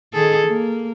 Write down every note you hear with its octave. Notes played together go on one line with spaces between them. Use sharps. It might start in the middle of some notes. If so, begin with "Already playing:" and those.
D#3 G#4 A4
A#3